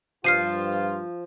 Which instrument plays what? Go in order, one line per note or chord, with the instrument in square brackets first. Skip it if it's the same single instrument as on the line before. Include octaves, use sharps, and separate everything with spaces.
[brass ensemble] G2 F4 [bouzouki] F3 [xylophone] F6 C7 D#7